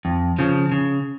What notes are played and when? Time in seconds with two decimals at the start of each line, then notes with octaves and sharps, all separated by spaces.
0.05 F2
0.39 C#3 F3
0.72 C#3